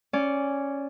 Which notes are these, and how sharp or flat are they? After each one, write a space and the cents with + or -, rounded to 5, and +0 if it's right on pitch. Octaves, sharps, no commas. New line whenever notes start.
C#4 -5 D5 -15